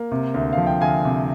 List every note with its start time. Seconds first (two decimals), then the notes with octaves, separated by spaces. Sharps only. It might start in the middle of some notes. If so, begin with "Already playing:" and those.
Already playing: A#3
0.12 C3
0.34 D2
0.53 F3 F5
0.67 G5
0.81 D2 F5 G#5
1.05 C3